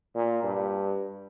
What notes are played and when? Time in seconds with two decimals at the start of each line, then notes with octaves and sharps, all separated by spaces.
0.15 A#2
0.43 G2